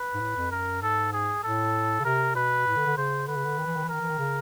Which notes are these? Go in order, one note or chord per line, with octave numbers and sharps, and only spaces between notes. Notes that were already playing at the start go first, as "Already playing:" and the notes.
Already playing: B4
G#2
A2
F2
F#2 A#4
G#2 A4
G#4
A2 A4
C#3
C3 A#4
B2 B4
A2
D3
D3
C#3 C5
D3 B4
C#3
D3
D#3
E3
D#3
E3
D#3 A#4
E3
D#3
C#3